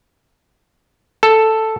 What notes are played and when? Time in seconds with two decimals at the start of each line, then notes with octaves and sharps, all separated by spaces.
1.23 A4